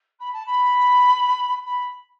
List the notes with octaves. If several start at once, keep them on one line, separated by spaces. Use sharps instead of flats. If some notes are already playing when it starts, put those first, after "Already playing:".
B5
A5
B5
B5